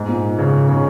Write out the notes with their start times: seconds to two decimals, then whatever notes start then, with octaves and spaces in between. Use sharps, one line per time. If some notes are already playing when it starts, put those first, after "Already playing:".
Already playing: G#2
0.08 A#2
0.39 C#3
0.68 C#3